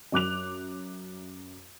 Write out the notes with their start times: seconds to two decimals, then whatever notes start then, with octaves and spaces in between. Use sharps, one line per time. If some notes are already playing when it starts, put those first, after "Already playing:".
0.12 F#2 D6 F#6 F7